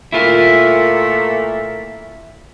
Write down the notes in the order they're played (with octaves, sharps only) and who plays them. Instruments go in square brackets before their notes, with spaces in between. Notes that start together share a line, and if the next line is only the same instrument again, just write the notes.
[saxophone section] A#2 A3 A#3 [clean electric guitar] E4 F4 A#4